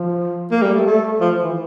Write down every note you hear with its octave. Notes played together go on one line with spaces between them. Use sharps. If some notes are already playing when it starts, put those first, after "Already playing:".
Already playing: F3
A#3
G3
A3
A3
F3
E3